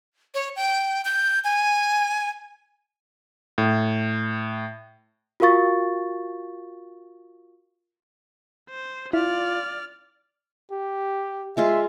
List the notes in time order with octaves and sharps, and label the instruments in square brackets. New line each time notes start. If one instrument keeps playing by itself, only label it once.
[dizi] C#5
G5
G6
G#5
[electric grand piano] A2
[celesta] F4 F#4 A#4 F5 C#6 A6
[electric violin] C5
[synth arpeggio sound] E4 [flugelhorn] F4 [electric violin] D5 F6
[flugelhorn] G4
[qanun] G#3 F4 G#4 [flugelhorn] E5